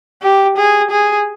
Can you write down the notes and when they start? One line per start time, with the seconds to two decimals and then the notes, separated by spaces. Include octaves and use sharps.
0.22 G4
0.57 G#4
0.91 G#4